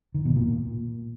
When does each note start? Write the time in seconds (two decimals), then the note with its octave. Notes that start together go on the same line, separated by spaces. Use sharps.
0.14 D#3
0.25 B2
0.36 A#2